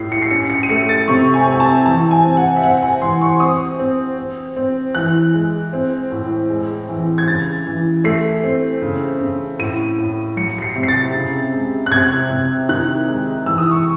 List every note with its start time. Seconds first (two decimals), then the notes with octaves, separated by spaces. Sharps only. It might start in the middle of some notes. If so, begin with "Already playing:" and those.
Already playing: A2 C7
0.12 C#7
0.22 C7
0.31 C#4 C#7
0.50 C#7
0.63 D#7
0.69 A3 C#7
0.89 A6
1.08 C3 C#6
1.34 G#5
1.47 C4
1.52 G#5
1.60 A5
1.85 E3 A5
2.11 G#5
2.24 C4
2.37 F#5
2.56 E5
2.63 C4 F#5
2.82 G#5
3.02 E3 C6
3.21 C#6
3.40 C4 D#6
3.79 C4
4.18 C4
4.56 C4
4.95 E3 F#6
5.34 G#3
5.73 C4
6.11 A2
6.50 G#3
6.89 E3
7.18 G#6
7.28 C#3 A6
7.66 E3
8.04 A3 C7
8.43 C4
8.82 C#3
9.21 C#3
9.59 A2 D#7
9.98 A2
10.37 F#3 C#7
10.58 C#7
10.62 C7
10.75 C3
10.83 C7
10.88 A6
11.14 C#3
11.53 G#3
11.86 F#6
11.92 C3 G#6
12.30 C3
12.69 D#3 F#6
13.08 G#3
13.46 E3 E6
13.58 D#6
13.71 C#6